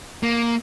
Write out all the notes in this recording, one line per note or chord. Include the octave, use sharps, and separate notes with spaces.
A#3